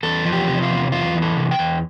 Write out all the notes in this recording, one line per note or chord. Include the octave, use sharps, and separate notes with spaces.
E2 A4
F3
G4
C3
F4
E2
E2 F4
E3
A4
C3
G5
E2